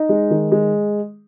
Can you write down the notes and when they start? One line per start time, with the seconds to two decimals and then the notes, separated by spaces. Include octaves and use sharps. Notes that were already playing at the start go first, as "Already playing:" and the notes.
Already playing: D#4
0.09 G#3
0.30 D#3
0.52 G#3